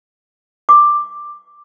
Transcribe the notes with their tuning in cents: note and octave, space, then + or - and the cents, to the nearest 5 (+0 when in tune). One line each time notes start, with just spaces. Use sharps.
D6 +5